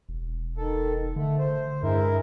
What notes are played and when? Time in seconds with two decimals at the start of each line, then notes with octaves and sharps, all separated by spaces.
0.09 E1
0.57 D#3 A4
1.16 D3 A3
1.39 C5
1.83 G2 G#3 E4 A#4